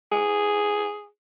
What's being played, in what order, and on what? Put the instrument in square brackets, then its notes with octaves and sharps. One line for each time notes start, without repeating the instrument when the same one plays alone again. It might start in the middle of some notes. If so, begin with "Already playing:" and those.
[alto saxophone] G#4